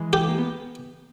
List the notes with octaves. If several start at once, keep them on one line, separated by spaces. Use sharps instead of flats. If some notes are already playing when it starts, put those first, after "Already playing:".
Already playing: E3 G#3
G4
A#3
B3